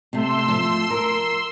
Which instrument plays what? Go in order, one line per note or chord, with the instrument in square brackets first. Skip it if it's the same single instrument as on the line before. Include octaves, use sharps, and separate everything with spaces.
[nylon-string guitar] C3 A3 [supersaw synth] C6 E6
[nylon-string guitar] F3 A3
A#4